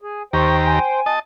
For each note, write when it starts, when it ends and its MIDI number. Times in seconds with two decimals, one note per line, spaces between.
0.01 0.23 68
0.33 0.79 39
0.33 0.79 67
0.33 1.00 72
0.33 1.00 79
0.33 0.79 82
0.33 0.57 85
0.65 1.13 80
1.06 1.19 75
1.06 1.19 81